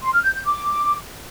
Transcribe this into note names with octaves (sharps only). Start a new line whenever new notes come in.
C6
F6
G6
G6
D6